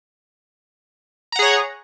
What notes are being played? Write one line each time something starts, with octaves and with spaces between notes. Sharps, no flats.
G#4 C#5 F#5 A#5